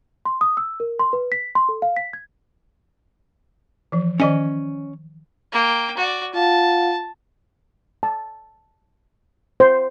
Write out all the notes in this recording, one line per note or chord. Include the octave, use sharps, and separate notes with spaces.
C6
D#6
E6
A#4
C6
B4
B6
C6
A4
F5
B6
G#6
E3 F3
D#3 C#4 D5 D#5 G#5
A#3 G5
F#4 D5
F4 F5 F#5 A5
A5
C5